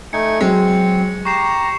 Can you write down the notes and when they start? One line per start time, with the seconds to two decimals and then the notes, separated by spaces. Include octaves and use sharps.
0.13 A3 D#4 G#5 C#7
0.41 F#3 G#3 C4
1.25 G4 A#5 C#6 C7 E7